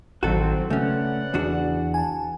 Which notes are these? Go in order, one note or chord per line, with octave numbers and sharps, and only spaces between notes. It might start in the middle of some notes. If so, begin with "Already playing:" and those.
A1 D#3 F#3 C4 F#4 A4
C#3 A3 C#4 B4 D5 F#5
E2 D4 F#4
G#5 A5